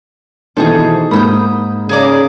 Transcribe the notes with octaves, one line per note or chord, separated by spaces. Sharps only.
B2 D#3 E3 D4 D#4 G#4 A4 C5
G#2 A#3 B5 D#6 E6 G6
C#3 G#4 A#4 D5